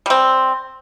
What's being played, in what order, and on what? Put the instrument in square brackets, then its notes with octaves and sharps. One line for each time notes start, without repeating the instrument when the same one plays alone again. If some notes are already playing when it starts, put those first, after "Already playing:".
[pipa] G3 C4